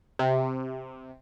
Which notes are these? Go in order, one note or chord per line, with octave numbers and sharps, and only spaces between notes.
C3